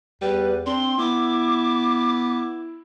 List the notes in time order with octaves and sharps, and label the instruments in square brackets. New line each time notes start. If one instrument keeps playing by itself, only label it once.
[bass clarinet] E2 [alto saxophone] G3 [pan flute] B4
[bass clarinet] C4 [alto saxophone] D4 [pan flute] C6
[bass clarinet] B3 [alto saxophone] E4 [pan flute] D6